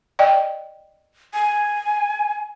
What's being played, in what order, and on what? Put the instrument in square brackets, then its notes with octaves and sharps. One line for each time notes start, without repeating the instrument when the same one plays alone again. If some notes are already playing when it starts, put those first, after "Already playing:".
[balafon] D5 D#5 G5
[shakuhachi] G#5